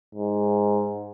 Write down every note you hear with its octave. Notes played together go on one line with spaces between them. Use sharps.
G#2